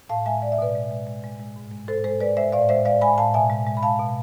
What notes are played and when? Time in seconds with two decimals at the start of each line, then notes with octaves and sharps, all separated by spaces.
0.09 A2 F5 A5
0.26 G#3 E5 G#5
0.42 G#3 D5
0.52 E5
0.58 B2 B4 D5
0.75 G#3
0.91 G#3
1.07 G#3
1.24 G#3
1.40 G#3
1.56 G#2
1.72 G#3
1.88 G#2 A4 C5
2.04 G#3 A4 C5
2.20 G#3 B4 D5
2.37 G#3 C5 E5
2.52 A2 D5 F5
2.69 G#3 C5 E5
2.85 G#3 D5 F5
3.01 G#3 G#5 B5
3.18 A2 F5 A5
3.34 B2 E5 G#5
3.50 G#3
3.66 G#3
3.77 B5
3.83 G#3 F5 A5
3.99 B2